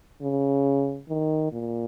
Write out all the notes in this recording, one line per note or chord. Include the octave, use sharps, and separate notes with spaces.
C#3
D#3
A#2